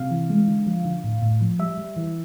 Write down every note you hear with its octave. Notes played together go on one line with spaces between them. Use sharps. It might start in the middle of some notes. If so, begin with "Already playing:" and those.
Already playing: C3 F5
E3
G#3
D3
F3
D3
A2
A2
F3
G3 E5
G3
E3